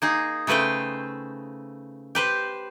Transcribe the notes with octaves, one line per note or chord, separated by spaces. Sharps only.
A#3 D#4 G#4
C#3 A3 B4 C5 G5
G4 B4 C5